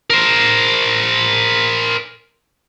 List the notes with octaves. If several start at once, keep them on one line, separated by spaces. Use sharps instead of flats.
A#4 C5